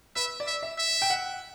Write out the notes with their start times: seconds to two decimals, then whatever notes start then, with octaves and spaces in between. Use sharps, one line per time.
0.16 B4 E5
0.40 D5
0.47 E5
0.63 E5
0.78 E5
1.02 G5
1.10 F#5